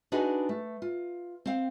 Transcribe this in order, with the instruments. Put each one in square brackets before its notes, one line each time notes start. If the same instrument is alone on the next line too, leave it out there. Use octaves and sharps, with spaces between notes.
[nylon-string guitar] D4 D#4 F#4 G#4 B4 D#5
A3
F4
C4 F5 G5